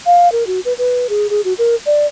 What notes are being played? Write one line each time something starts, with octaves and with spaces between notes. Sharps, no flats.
F5
A#4
F#4
B4
B4
G#4
G#4
F#4
A#4
D5